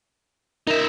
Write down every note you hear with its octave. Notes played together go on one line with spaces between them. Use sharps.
D#4 A#4 E5